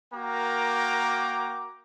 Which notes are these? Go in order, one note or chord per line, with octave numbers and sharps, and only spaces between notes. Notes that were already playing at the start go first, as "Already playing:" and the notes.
A#3 F#4 A#4 G5 A#5 D6